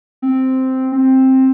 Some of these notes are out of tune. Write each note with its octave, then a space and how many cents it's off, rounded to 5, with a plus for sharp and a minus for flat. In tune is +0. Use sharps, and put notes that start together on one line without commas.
C4 -5
C4 +10